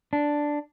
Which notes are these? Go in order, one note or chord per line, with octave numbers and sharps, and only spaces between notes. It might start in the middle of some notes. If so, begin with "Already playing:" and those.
D4